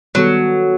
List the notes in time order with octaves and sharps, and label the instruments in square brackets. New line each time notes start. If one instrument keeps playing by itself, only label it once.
[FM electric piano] D#3 G3 B3 F#4 A4 [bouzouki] F#3